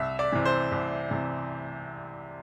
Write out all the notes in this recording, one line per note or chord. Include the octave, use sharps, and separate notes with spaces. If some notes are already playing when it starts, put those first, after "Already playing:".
Already playing: C2 E5
D5
C3 E3
C5
C2
C3 E3